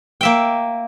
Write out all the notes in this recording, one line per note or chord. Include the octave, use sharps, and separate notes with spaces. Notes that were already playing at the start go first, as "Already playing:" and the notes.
A#3 E5 G5